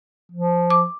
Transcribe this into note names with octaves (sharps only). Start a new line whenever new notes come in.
F3
D6